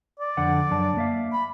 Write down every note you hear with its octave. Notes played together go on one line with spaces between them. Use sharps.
D5
F2 D3 F#5
F#2 D4 A5
A#3 E5 F5
B5